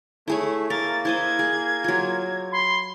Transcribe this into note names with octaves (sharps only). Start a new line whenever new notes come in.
A3 E4 G#4 C#5
A#3 A#4 A6
E4 C5 D#5 G#6
G#4
F#3 F4
B5 C6